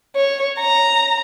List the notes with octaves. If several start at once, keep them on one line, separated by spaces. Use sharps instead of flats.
C#5
A#5